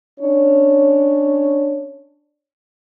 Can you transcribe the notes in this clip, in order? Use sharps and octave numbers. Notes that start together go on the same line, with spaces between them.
C#4 D4 C#5